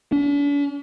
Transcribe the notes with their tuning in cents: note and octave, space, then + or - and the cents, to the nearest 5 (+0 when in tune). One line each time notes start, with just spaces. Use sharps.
D4 -45